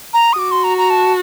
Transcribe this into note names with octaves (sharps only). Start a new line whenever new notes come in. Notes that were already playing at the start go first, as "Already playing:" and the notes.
A#5
D#6
F#4 D6
C6
A#5
A#5
A5